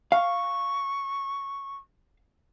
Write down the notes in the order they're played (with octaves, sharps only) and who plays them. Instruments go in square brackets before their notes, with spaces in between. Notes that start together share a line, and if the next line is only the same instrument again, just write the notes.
[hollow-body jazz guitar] F5 [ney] C#6